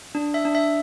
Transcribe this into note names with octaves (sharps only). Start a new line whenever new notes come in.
D4
E5
D4
E5